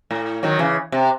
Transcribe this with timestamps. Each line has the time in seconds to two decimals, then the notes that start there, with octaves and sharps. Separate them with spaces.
0.11 A2
0.43 D#3 F#3
0.59 C#3 E3
0.92 C3